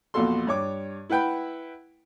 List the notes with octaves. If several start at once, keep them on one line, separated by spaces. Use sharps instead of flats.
A#1 E2 F4 F#4 A4 C6
G2 C#5 D6
E4 B4 F#5 G5 B5